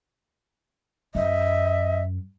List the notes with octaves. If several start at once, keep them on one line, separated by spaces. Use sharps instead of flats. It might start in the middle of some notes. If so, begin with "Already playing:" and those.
F#2 D#5 E5